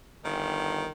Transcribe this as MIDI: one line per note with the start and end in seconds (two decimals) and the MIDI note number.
0.25 0.85 31
0.25 0.91 51